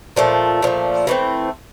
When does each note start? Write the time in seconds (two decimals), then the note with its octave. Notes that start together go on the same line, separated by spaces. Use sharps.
0.16 A#2 F3 A3
0.62 A#2 F3 A3
1.07 E3 A3 C4